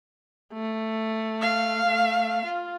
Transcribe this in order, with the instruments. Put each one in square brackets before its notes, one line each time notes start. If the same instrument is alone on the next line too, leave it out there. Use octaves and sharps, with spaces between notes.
[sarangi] A3
[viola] F5
[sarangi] A3
F4